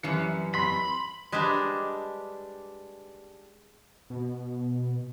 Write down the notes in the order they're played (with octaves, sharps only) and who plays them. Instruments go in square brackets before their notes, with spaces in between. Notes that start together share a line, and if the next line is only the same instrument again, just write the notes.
[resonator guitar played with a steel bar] F#2 E3 G3 [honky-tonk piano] C#7
[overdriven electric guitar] B5 [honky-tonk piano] C6 B6
[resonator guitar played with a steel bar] G3 D4 [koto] G#3 B4 C5
[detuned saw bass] B2